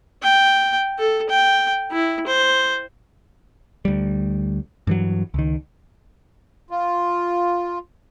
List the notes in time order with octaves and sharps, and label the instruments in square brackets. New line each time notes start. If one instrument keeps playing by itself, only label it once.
[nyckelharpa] G5
A4
G5
E4
C5
[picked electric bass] D2 G3
G2 E3 F#3
C#2 D#3
[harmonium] F4